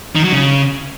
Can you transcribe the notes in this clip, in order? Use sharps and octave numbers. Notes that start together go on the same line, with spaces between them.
D#3
F#3
C#3